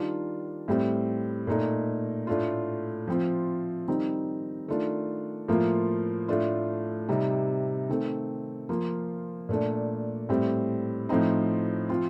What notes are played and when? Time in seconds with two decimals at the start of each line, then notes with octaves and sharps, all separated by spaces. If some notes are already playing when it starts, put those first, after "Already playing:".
Already playing: D#3 G3 D4 F4
0.68 A2 G3 C4
1.47 A#2 A3 D#4
2.27 A2 A3 D4 F4
3.07 F3 C4 F4
3.88 D#3 G3 C4 D#4
4.68 D#3 A3 D4 F4
5.48 A2 F3 A#3 F4
6.28 A2 A3 D4 F4
7.09 C3 G3 C4 D#4
7.89 D#3 A3 C4
8.69 F3 A#3 F4
9.49 A#2 A3 D4
10.29 A2 G3 C4
11.09 A2 F3 C4 D#4
11.89 F3 C4 F4